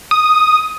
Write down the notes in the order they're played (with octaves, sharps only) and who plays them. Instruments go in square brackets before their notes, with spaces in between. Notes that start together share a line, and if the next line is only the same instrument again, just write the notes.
[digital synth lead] D#6